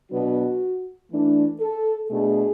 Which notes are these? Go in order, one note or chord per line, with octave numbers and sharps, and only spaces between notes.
B2 F#3 B3 D4 F#4
E3 A3 D4
A4
B2 A3 D4 G#4